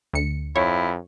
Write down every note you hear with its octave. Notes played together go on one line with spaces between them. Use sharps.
D2 C#7
F2 E4 C#5